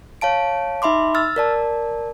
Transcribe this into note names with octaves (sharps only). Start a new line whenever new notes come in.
C#5 F5 A5 D7
D#4 E5 B5 C6 D6
E6 F6 A6
A#4 D5 A5